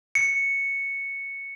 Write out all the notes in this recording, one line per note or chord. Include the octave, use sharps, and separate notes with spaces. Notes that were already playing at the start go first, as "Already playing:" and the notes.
C#7